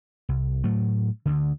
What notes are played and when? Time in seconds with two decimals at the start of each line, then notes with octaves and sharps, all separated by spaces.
0.29 C2
0.64 A2 F#3 A3
1.26 D2 D3